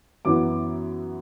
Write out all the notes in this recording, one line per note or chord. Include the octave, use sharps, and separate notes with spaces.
F#2 E3 B3 D6